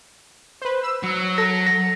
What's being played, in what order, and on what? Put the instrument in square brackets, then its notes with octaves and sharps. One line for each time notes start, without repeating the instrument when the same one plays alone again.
[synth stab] B4 C5
E6
[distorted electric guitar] F#3
[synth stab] A4 [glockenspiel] A#6
[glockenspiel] A#6